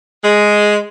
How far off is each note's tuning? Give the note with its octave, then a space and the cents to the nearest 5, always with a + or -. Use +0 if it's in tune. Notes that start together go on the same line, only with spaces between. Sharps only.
G#3 +0